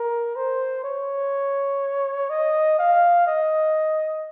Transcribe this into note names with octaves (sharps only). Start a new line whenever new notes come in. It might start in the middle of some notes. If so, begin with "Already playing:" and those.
Already playing: A#4
C5
C#5
D#5
F5
D#5